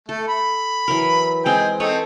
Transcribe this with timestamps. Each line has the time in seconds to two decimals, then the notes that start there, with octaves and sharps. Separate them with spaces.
0.09 A3 A4
0.28 B5
0.88 E3 F#3 A#4
1.46 G#3 C4 D#4 G#4 G5
1.80 C4 D#4 A4 B4 C#5